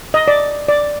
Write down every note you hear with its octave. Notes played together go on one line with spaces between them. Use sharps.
D#5
D5
D5